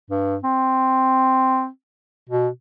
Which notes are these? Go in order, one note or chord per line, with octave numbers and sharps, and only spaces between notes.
G2
C4
B2